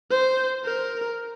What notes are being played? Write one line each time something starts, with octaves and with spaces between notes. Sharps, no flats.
C5
A#4